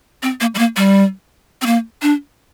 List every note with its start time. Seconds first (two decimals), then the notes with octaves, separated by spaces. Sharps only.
0.23 C4
0.41 A#3
0.55 G3
0.59 A#3
0.77 G3
1.62 C4
1.66 A#3
2.02 D4